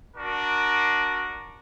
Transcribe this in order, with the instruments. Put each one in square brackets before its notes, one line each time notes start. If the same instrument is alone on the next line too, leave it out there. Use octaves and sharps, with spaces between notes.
[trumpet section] D4 F#4 A#4